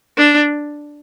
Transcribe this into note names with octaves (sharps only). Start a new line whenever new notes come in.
D4